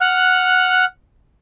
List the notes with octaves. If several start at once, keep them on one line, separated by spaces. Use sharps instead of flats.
F#5 F6 F#6